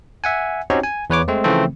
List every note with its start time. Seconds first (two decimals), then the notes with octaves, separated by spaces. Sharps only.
0.24 E5 F#5 G#5
0.70 C4 C#4 D#4 F#4 G4 C#5
0.84 G#5
1.10 E2 B4 C#5 D6
1.28 G#3 A3 C4
1.44 C#3 E3 F3 A3 C4